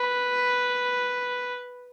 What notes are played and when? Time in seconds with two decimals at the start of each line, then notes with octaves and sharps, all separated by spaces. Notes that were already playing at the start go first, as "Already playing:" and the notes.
Already playing: B4